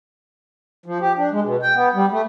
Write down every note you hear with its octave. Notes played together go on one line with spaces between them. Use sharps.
F3
G4
D4
G#3
B2
G5
B3
G3
A3